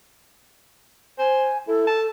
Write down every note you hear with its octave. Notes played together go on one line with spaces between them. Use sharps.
C5 G#5
E4 A4
A5